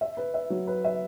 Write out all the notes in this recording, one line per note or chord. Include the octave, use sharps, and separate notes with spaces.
E5
B4
E5
F#3
B4
E5